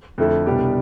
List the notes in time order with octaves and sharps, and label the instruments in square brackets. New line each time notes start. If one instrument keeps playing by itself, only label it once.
[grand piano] F2 D3 A3 E4 A4
[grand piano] C2 B2 G3 D4 G4 [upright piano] B3